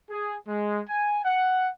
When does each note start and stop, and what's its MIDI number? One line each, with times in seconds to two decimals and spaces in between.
0.10 0.35 68
0.47 0.81 56
0.89 1.18 80
1.25 1.69 78